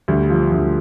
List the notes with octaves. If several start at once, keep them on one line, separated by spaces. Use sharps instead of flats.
D2 G3
F3
D2